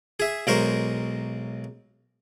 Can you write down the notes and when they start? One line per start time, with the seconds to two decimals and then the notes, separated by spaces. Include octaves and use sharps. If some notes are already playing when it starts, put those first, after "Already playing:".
0.20 G#4 E5
0.47 B1 G#3 A#4 C5 C#6